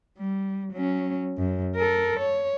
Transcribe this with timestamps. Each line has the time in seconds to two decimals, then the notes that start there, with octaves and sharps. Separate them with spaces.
0.18 G3
0.72 F#3 C#4
1.38 F#2
1.76 A4 A#4
2.20 C#5